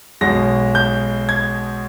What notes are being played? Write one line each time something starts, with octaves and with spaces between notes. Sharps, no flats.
B1 B2 G#3 A#6
G6
G#6